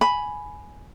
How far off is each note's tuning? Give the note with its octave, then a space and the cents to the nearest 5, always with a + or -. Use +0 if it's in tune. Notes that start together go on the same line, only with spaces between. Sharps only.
G#5 +10 B5 +0